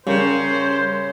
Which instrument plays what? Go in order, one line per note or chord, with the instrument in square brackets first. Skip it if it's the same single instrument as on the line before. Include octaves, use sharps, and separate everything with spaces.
[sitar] C#3 [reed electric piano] G3 C#4 A#4 [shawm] C5